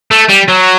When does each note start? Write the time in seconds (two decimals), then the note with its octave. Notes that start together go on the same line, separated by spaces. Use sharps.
0.11 A3
0.29 G3
0.48 F#3